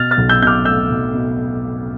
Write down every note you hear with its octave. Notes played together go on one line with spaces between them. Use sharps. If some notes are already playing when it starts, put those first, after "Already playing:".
Already playing: B2 F6 A6
F6 A6
B1
E6 G6
B2 G6
D6 F6
A3 E6 G6
B1
B2